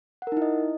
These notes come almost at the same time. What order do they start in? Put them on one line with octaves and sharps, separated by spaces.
F#5 A#4 D#4 E4 D#5